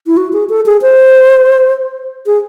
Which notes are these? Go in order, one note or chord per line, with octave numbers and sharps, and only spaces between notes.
E4
F#4
G#4
A4
G#4
C5
G#4